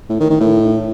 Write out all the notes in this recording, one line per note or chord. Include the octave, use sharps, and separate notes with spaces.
A2
D#3
D#3
A2